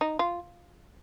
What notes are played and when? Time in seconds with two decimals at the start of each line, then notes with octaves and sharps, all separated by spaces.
0.01 D#4
0.19 F4